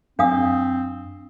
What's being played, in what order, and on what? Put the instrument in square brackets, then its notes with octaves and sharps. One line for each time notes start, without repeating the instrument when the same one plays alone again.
[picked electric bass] F#2 [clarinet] C4 [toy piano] D4 F5 D#6